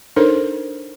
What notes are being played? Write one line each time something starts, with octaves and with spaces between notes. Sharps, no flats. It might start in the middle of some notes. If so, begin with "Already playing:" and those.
D4 D#4 A4 A#4 C5 C#5